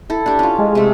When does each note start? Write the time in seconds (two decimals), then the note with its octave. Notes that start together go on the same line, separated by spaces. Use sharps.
0.10 E4 A4
0.26 D4 G4
0.39 C#4 F4
0.58 G#3
0.75 C3 A3